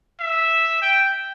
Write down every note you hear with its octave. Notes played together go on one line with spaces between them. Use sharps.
E5
G5